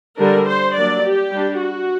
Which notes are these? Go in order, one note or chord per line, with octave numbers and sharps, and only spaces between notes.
D3 G3 D4 A#4
C5
F#3 A#3 D4 D5
G4
G3 D4
F#4